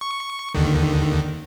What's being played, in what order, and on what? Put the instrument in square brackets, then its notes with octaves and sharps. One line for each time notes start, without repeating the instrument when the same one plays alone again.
[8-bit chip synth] C#6
D#2 D3 D#3